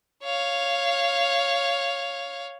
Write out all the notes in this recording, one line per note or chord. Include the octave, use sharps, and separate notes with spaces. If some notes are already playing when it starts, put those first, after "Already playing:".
C#5 F5